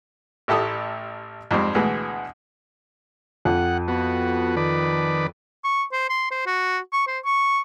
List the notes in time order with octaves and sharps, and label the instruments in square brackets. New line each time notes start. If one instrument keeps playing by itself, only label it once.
[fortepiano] A1 E4 G4 A4 D#6
F2 G#2 G3 C4
D2 B2 E3 G#3
[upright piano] F2 [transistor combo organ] F#5
[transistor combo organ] B3 F#4
D#3 B4 D5
[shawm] C#6
C5
C6
C5
F#4
C#6
C5
C#6